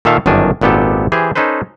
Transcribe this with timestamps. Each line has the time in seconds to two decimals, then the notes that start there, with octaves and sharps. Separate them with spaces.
0.05 A#2 D#3 A4 E5 F5 A5
0.26 G1 F#2 D#3 D4 G#5
0.61 G#1 A#2 B3 G4 A4
1.12 E3 G4 G#4 C5
1.35 C#4 D#4 A4 B4 C5